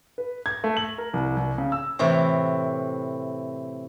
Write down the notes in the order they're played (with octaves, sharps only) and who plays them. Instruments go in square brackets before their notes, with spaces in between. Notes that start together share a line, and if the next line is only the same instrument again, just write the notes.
[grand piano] B4
G#6
A3
F#7
A#4
C2
C2
C#3
E6
[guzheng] A2 C3 E3